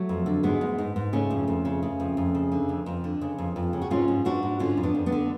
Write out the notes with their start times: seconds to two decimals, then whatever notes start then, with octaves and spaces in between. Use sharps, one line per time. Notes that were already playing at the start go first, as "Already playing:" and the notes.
Already playing: F#3 A3
0.09 F2
0.26 D3
0.43 G#2 G#3 B3
0.61 G#2
0.78 G#2
0.96 G#2
1.13 C#3 A3 C#4
1.31 F2
1.48 F2
1.65 C#3
1.83 C#3
2.00 F2
2.17 F2
2.35 C#3
2.52 D3
2.69 F2
2.86 F2
3.04 D3
3.21 C#3
3.38 F2
3.56 F2
3.73 C#3
3.82 F#4
3.91 G#2 C#4 F4
4.08 G#2
4.25 G#2 D4 F#4
4.43 G#2
4.60 D3 C#4 F4
4.77 F2
4.83 B3 D4
4.95 F2
5.06 B3 D4
5.12 D3